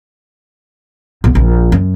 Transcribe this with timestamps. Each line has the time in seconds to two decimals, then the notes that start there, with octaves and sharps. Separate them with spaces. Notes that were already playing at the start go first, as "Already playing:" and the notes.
1.24 B1
1.35 A#1
1.72 F#2